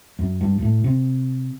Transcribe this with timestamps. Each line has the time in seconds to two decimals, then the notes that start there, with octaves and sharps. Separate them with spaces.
0.19 F#2
0.41 G2
0.58 G2
0.62 A2
0.84 C3